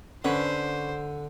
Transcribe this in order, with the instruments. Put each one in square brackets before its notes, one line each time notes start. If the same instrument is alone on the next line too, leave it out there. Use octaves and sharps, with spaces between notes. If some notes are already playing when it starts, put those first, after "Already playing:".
[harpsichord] D3 [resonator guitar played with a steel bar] C#4 B4 [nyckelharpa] C5